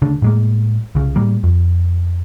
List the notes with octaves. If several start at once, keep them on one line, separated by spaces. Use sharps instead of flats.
D2 C#3 D4
A2 G#3 A#3
C2 C#3
A2 G3 A#3
F2